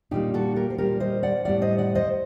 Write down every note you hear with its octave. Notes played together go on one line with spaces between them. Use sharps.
A#2 G3 A#3 D#4 G4
F#4 A4
G4 A#4
C5
A#2 G3 A#3 G4 A#4
C5 D#5
D5 F#5
A2 G3 A#3 D5 F#5
C5 D#5
D5 F#5
C5 D#5